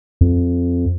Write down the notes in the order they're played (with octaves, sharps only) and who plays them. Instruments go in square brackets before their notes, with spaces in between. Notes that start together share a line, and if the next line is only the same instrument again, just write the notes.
[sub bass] F2